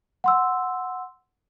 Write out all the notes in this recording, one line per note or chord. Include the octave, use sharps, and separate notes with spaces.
F#5 C6 E6